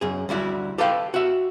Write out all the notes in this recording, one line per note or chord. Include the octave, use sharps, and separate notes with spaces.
F#2 G#4
D2 G3 E4 F#4
G4 A4 B4 F5 G5
F#4 E5